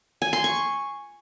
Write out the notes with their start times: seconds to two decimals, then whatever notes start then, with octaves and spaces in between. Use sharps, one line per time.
0.22 G#5
0.33 C6
0.44 C#6